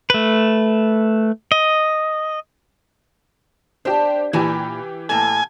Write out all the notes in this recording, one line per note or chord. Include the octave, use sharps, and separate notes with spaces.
A3 B4
D#5
D4 G4 C5
A#2 E3 E4 G4 G#5
A2 A#3 A4 G#5